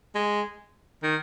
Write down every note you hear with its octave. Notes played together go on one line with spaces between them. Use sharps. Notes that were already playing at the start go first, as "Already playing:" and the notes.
G#3
D#3